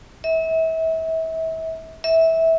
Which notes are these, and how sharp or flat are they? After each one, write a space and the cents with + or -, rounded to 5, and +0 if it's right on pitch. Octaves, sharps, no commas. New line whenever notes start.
E5 -35
E5 -20